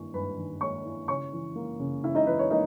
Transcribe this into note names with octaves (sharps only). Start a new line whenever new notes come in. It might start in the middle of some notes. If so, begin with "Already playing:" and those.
Already playing: G2 D#3 A#3 E4 C#6
G2 B4 B5
D#3
A#3 C#5 C#6
E4
C#3 C#5 C#6
E3
A#3
C#3
C#3 E4 E5
D#4 D#5
E3 B4
C#5
A#3 D#4 D#5